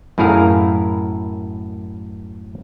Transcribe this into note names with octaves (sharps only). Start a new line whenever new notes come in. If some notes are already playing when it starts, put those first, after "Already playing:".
F#2 A2 E4 G#4 A#4 F5